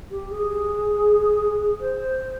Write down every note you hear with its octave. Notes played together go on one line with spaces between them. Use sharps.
G4
G#4
C5